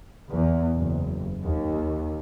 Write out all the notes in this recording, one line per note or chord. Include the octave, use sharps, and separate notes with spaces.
E2
F#1
D#2